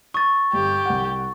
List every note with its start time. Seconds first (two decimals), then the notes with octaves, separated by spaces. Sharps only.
0.14 C#6 D#6 A6
0.53 G1 G4
0.86 C2 F#5